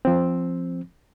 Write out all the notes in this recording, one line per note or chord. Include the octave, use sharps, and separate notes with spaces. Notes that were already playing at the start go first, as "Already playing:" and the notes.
F3 C4